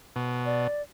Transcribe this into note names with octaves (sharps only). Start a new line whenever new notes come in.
B2
D5